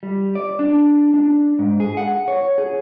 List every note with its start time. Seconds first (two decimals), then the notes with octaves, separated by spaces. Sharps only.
0.03 G3
0.35 D5
0.59 D4
1.14 D4
1.59 G#2
1.80 G#4
1.97 F#5
2.28 C#5
2.58 G#4